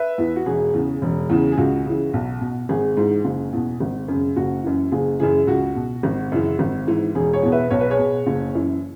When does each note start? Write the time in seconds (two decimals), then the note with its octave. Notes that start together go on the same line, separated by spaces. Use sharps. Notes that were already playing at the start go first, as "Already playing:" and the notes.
Already playing: B4 E5
0.18 E2 E3
0.36 F#4
0.46 E1 G#4
0.74 E2 C#3
1.02 E1
1.30 E2 C#3 E3
1.52 G#4
1.58 C#2 F#4
1.85 C#3 E3
2.13 B1
2.41 B2
2.69 G#1 G#4
2.97 G#2 E3
3.25 F#1
3.53 E2 B2
3.80 G#1
4.08 F#2 C#3
4.36 F#1 F#4
4.64 F#2 E3
4.92 F#1 G#4
5.20 F#2 C#3 E3 G#4
5.47 C#2 F#4
5.76 B2
6.03 G#1
6.32 F#2 C#3 E3
6.59 G#1
6.87 G#2 E3
7.15 E1 G#4
7.33 G#4 C#5
7.43 E2 B2
7.52 B4 E5
7.70 B1 C#5
7.81 B4
7.90 G#4 C#5
7.99 B2
8.27 F#1
8.54 F#2 E3